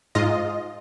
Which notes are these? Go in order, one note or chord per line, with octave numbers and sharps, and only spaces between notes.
G#2 F4 D#5